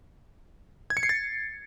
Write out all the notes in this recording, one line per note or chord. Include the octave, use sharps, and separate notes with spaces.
G#6
C#7
C7
A6